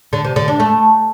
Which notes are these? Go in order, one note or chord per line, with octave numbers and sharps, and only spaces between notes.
D3
C3
D3
D4
A3